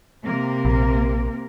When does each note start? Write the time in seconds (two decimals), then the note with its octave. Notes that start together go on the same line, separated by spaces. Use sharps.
0.23 C3 A#3 A#4
0.65 A#1